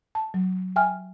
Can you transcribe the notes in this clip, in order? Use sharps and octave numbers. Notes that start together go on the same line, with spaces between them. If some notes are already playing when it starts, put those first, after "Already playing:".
A5
F#3
E5 G5 G#5 F6